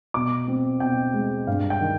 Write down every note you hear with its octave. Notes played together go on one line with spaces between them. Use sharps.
B2 D6
C4
B2 G5
G#3
G2 F5
G5
D#3